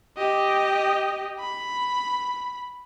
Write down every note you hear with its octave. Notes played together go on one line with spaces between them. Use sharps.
G4 D#5
B5